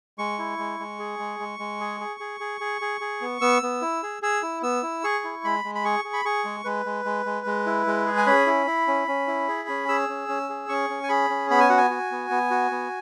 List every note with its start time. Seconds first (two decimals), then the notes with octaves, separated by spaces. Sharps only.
0.18 G#3 C#6
0.39 E4
0.58 G#3
0.80 G#3
0.99 G#4
1.19 G#3
1.40 G#3
1.59 G#3
1.80 G#4
2.00 G#4
2.20 G#4
2.40 G#4
2.61 G#4
2.81 G#4
3.01 G#4
3.21 B3
3.41 B3 E6
3.63 B3
3.82 E4
4.03 G#4
4.22 G#4 E6
4.42 E4
4.62 B3 E6
4.83 E4
5.04 G#4 C#6
5.24 E4
5.44 G#3 B5
5.64 G#3
5.75 B5
5.85 G#4 C#6
6.04 G#4
6.13 B5
6.25 G#4 C#6
6.45 G#3
6.65 G#3 B4
6.86 G#3
7.05 G#3
7.26 G#3
7.46 G#3
7.66 E4
7.87 G#3
8.06 G#4
8.17 G#5
8.27 C#4 B5
8.47 E4
8.67 E4
8.87 C#4
9.08 C#4
9.27 E4
9.48 G#4
9.69 C#4
9.89 G#4 E6
10.09 C#4
10.29 C#4
10.49 G#4
10.69 C#4 C#6
10.90 C#4
11.03 G#5
11.09 G#4 B5
11.30 C#4
11.50 B3 B5
11.60 G#5
11.69 F#4 F#5
11.78 G#5
11.90 F#4
12.11 B3
12.30 B3
12.51 F#4
12.71 B3